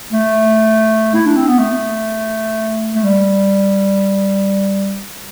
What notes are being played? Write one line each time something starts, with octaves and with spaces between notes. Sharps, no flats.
A3
E4
D4
C4
B3
A3
A3
G3